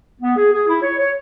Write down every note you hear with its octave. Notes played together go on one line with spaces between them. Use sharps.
B3
G#4
G#4
E4
C#5
C#5